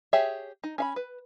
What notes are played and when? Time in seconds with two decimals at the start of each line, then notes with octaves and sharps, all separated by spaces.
0.13 G4 G#4 C#5 E5
0.64 D#4
0.78 C#4 F5 B5
0.96 B4